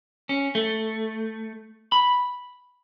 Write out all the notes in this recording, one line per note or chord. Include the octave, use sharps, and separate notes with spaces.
C#4
A3
B5